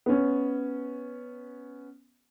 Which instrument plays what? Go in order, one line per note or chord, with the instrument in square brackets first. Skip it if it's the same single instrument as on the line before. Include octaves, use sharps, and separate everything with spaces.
[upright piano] B3 C#4